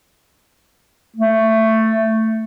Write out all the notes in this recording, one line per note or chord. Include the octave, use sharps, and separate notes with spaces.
A3